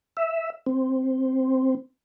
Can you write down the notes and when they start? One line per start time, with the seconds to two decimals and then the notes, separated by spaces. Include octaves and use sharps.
0.17 E5
0.66 C4